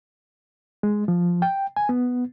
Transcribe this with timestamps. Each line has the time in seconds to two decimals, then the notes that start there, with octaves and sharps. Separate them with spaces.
0.83 G#3
1.08 F3
1.42 G5
1.76 G#5
1.89 B3